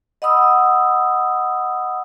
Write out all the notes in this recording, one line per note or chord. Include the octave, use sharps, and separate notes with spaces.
D#5 F#5 B5 D#6 E6